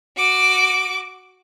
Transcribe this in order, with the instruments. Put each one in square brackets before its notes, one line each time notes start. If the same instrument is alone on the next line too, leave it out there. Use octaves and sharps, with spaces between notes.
[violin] F#4 D6